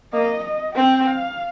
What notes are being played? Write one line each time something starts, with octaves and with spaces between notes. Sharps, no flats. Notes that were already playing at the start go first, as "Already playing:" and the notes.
A#3 D#5
D#5
C4 G5
F5